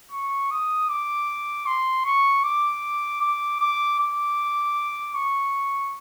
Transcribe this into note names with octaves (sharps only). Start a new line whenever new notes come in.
C#6
D#6
D6
C6
C#6
D6
D6
D6
D6
C#6